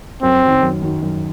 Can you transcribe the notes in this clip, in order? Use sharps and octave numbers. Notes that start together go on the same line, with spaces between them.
F#2 C4
D#3 F#3
F#2
D#3 F#3
F#2